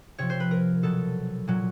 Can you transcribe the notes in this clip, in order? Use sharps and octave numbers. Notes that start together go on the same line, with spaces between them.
C3 F3 C#5
C5
B4
A#4
B2 F#3 A4
A#2 F#3